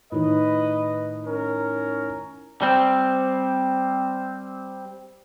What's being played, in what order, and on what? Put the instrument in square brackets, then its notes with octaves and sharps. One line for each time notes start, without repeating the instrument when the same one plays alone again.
[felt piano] A2 D#3 [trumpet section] B4 D#5
[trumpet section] C#4 A#4
[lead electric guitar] G3 C4